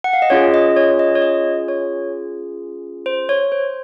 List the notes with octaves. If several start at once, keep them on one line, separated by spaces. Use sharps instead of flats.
F#5
F5
D#5
C#4 F4 G#4 C#5
D#5
C#5
D#5
C#5
D#5
C#5
C5
C#5
C5